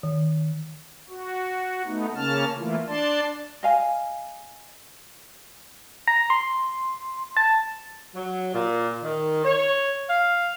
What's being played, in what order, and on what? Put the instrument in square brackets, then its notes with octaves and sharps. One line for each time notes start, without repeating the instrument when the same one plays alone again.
[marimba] D#3
[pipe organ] F#4
A3 B3 D#4
C#3 A#3 C#4 A5 F6
E3 A3 A#3 E4 F4
D4 D5 A5 C6
[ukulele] D#5 F5 G#5
[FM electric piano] A#5
C6
A5
[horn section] F#3
A#2
D#3
C#5
F5